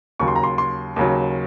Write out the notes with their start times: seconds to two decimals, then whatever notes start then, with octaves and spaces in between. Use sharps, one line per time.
0.19 D#2 C#3 F#3 C#6
0.28 C6
0.36 A#5
0.44 C6
0.58 C6
0.96 D#2 C#3 F#3